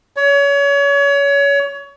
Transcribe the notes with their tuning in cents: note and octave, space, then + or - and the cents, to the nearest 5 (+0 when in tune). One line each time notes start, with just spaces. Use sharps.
C#5 +30